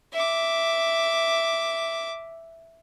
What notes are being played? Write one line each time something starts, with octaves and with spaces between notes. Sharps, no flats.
E5 D6